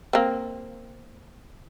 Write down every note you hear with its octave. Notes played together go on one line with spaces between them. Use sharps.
A#3 C4